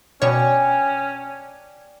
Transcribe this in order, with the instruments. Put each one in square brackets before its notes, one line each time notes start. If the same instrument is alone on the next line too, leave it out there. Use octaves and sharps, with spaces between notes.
[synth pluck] B2 C#5 [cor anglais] C#4 [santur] D4 G5 G#5